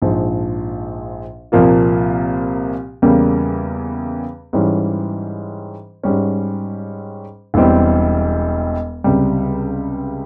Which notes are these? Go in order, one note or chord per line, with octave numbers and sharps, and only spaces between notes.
A#1 G#2 F3
C2 A#2 F3 A#3 F4
E2 C#3 G3 A#3
G#2 E3 G3 C#4
G#2 G3 C#4
E1 E2 E3 G3 C4
C#2 C3 G3